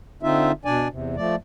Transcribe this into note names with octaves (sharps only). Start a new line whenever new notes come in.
D3 C4 D#4 F4 E5
B2 D4 D5 G#5
E2 C3
F3 A3 D5